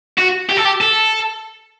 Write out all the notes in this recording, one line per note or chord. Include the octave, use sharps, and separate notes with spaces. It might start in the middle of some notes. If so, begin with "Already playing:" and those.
F#4
G4
A4
G4
A4